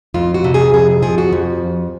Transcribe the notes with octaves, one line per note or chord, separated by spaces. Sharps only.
F2 F4
F#4
C3
G#4
F2 G#4
F3 G#4
F#4
F2